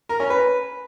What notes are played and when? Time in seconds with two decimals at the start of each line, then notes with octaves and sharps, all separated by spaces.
0.09 A#4
0.20 C#4
0.30 B4